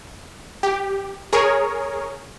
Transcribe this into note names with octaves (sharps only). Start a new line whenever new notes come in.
G4
G#4 A#4 C#5